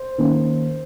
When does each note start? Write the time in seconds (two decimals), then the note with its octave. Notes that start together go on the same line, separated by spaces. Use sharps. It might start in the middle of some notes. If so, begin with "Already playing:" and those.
Already playing: C5
0.18 D#3 A#3 C#4